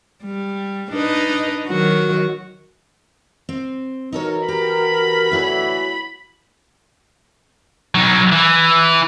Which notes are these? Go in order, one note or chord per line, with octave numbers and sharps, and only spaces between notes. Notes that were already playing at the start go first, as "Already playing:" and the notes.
G3
D4 D#4 B4
D#3 F#3 F#4
C4
E3 D#4 F#4 A4 A#4 C#5
G4 B5
A2 D3 E3 E4 F#4 C#5
F#3 D#4
E3